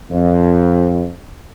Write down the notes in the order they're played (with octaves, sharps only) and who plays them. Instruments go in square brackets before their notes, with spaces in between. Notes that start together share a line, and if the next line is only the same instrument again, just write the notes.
[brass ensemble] F2